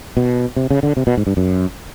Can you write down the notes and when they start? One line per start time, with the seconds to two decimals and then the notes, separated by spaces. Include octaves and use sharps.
0.17 B2
0.56 C3
0.71 C#3
0.83 D3
0.97 C3
1.07 B2
1.17 G#2
1.27 G2
1.37 F#2